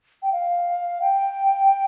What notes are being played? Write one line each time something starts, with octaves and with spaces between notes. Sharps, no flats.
G5
F5
G5